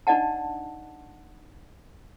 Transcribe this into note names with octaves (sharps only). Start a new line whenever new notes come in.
D4 D#4 D5 D#5 F#5 A5